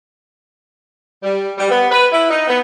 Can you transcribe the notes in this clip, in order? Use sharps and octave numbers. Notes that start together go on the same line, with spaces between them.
G3
G3
B3
B4
E4
D#4
B3